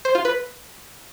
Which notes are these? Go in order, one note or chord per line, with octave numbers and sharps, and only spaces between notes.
C5
F4
B4